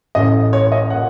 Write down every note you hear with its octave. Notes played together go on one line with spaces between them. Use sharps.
A1 A2 D#5
C#5
C#5
D#5
A#2 F#5